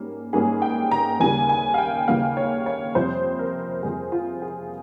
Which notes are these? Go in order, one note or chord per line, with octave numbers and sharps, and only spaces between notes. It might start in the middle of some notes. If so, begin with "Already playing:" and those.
Already playing: G#2 G3 A#3 C#4
G#2 G3 A#3 C#4 G#4
G5
A#5
D#2 C#3 G3 A#3 G#5
G#5
F5
G5
D#2 C#3 G3 A#3 F5
C#5
C#5
F2 C3 G3 C5
A#4
F2 C3 G3 G#4
F4
G#4